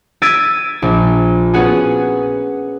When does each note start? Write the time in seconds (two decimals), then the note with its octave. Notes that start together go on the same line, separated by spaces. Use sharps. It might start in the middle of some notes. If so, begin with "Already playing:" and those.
0.22 E6 G#6 A6 B6 D7 D#7
0.82 A#1
1.54 B3 C#4 F#4 G#4